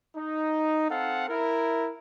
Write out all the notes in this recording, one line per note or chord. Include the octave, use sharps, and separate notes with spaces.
D#4
C4 A4 F5 F#5
E4 A#4